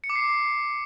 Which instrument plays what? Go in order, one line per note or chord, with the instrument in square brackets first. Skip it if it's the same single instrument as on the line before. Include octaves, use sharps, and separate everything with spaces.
[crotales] C#7
D6
C7